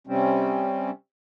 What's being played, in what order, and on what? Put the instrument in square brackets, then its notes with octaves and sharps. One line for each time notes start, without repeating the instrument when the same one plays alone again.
[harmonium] C3 G3 C4 C#4